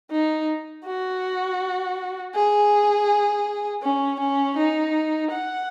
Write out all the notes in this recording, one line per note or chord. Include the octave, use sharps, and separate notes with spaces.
D#4
F#4
G#4
C#4
C#4
D#4
F#5